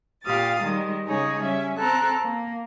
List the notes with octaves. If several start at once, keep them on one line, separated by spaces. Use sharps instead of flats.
A#2 G4 F5 D#6 A6
D#3 G3 G#3
C#3 G#3 D#4 G#4 C#5
G3 C#4 E5
C4 A4 A#5 F#6
A#3